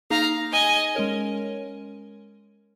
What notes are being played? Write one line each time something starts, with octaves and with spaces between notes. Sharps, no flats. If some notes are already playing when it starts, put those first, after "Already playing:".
A#3 D#4 G#4 F5 A#5
D#5 G#5
G#3 C#4 A#4 C#5